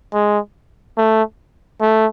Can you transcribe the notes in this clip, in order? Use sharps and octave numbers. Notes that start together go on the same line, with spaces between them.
G#3
A3
A3